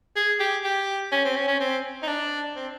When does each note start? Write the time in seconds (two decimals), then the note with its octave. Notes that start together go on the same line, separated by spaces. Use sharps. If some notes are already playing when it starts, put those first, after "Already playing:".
0.16 G#4
0.39 G4
0.64 G4
1.12 C#4
1.25 C4
1.36 C#4
1.47 C#4
1.60 C4
2.03 D#4
2.07 D4
2.56 C4